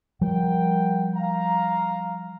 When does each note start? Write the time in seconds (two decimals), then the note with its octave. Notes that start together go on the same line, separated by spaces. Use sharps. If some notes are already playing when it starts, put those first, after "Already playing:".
0.21 F3 G3 A#4 F#5 G5
1.15 F5 A#5